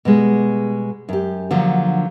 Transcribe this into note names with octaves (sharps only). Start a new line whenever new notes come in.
B2 G3 G#3
F#2 G4
D3 F3 F#3 A#3